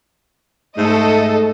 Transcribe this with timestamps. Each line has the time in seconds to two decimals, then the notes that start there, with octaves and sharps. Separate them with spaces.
0.78 G#2 A3 A4 D#5